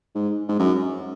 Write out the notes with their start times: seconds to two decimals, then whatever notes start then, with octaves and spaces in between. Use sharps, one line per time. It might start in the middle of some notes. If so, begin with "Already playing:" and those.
0.15 G#2
0.48 G#2
0.59 F#2